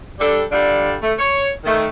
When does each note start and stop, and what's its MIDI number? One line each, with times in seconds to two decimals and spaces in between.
0.19 0.42 55
0.19 0.42 62
0.19 0.42 69
0.51 0.94 50
0.51 0.94 55
0.51 0.94 62
0.51 0.94 65
0.51 0.94 69
0.51 0.94 74
1.02 1.12 57
1.19 1.49 73
1.65 1.87 51
1.65 1.87 57